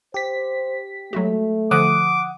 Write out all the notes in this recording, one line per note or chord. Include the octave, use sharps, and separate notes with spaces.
G4 C5 B6
F#3 G#3 A3 F#4
D3 F3 F#5 D6 D#6